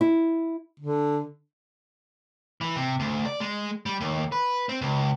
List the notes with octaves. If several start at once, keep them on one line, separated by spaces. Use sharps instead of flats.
E4
D3
E3
C3
D2
D5
G#3
G3
D#2
B4
C4
C#2